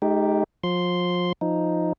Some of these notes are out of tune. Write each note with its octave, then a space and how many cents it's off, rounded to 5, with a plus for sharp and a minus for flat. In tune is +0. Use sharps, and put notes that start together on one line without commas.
G#3 +45 D#4 +0 G4 +0
F3 +30 C6 +0
F3 +0 D#4 +0